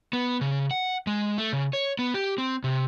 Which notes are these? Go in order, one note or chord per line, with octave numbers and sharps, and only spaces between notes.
B3
C#3
F#5
G#3
A3
C#3
C#5
B3
G4
C4
C3